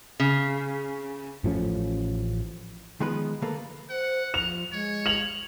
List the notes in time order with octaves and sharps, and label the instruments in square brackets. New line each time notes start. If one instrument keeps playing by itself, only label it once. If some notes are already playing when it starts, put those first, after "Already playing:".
[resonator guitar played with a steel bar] C#3
[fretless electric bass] A1 F3 A3 C#4
[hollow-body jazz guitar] D#3 F3 G#3 B3 B4
D3 A#3 A4 B4
[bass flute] C5 [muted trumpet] F#5
[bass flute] F3 [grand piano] F7
[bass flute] G#3 [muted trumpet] C#5
[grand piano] F7 F#7